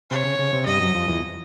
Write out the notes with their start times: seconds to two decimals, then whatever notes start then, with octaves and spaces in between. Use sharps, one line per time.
0.11 C3 C#5
0.25 C#3
0.39 C#3
0.53 C3
0.66 G2 D#5
0.80 F#2
0.94 F2
1.08 E2